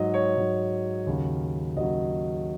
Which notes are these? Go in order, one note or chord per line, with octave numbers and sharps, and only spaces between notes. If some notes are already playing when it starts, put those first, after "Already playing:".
Already playing: G#2 F#3 D#5
C#5
G#2 F#3
D#2 C#3 F#3
D#2 C#3 F#3 D#5